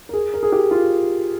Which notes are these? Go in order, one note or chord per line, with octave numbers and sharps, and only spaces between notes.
A#4
G#4
A#4
G#4
G4
F4